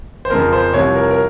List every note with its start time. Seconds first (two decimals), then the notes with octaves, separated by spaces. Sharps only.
0.25 C5
0.30 F2 C#3 F3 A#4
0.53 C5
0.74 C2 C3 F3 C#5
0.95 A#4
1.11 A#4